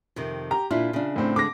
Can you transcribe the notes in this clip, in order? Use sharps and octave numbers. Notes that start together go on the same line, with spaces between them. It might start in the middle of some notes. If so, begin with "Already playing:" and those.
F2 C3 D#3
G4 A#5
A#2 D4 E4 F4
C#3 D4
A2 C4
D3 G#3 D6 A#6